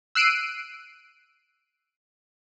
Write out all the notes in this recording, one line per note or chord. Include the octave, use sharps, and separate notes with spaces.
E6 F#6 C7 D7 D#7